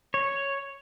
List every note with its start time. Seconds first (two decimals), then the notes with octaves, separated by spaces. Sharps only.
0.14 C#5